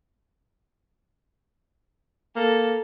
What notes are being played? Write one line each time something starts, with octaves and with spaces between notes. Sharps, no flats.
A#3 A4